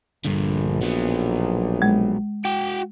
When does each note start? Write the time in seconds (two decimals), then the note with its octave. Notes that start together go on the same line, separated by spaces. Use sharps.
0.25 A#1 G2 D3
0.82 F#3 B3
1.82 G#3
2.45 F#4 G5